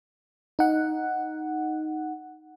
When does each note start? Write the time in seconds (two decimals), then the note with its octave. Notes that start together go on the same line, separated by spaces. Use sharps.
0.59 D#4 F#5